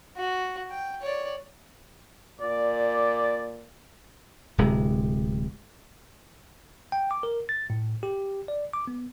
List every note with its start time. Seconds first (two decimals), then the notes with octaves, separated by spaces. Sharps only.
0.16 F#4
0.71 G5
1.02 C#5 D5
2.41 A#2 D5
4.58 D1 C3 G#3
6.92 G5
7.11 D6
7.23 A#4
7.49 A6
7.70 A2
8.03 G4
8.48 D5
8.73 D6
8.87 B3